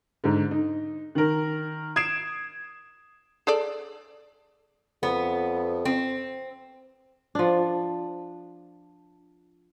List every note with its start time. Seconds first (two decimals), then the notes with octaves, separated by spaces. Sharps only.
0.24 G#2 D3
0.51 D#4
1.15 D#3 A#4
1.96 D#6 G#6 C7 D7 E7
3.47 G#4 A4 D5
5.03 F2 B3
5.85 C4
7.35 F3 D4